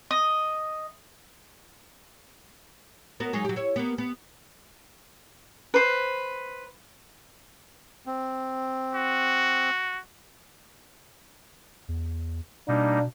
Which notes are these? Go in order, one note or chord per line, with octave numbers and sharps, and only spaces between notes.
D#5
B3 F#4 A#4
F#3 G#3 D#4
F#3 G4
E4 C#5
A#3 B3
B3
B4 C5
C4
F#4
E2
B2 G3 A#3 D4 D#4